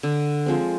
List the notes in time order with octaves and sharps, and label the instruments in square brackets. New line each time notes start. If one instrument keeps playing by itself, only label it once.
[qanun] D3
F3 G#3 C4